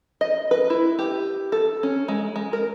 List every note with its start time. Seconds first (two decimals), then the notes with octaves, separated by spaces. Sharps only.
0.21 D#5
0.51 B4
0.70 E4
0.99 G4
1.52 A4
1.83 C#4
2.08 G#3
2.36 G#3
2.53 A#4